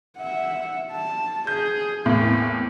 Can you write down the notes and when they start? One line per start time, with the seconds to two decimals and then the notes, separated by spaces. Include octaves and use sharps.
0.17 E5 F#5
0.91 A5
1.47 G#4 G6
2.06 E2 A2 A#3 C4